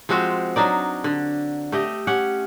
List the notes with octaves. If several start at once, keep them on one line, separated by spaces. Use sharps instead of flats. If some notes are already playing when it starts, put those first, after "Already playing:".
F3 G#3 C4 F#4
F#3 D4 D#4 D5
D3
A3 G4 D#5
C#4 G4 F#5